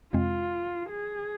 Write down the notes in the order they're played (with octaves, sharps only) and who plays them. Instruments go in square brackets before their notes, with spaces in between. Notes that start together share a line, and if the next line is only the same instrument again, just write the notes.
[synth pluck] F2 C3 G#3 C4 [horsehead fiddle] F4
[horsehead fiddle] G#4